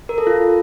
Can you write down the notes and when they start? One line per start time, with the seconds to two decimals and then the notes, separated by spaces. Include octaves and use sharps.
0.09 A#4
0.18 A4
0.27 F4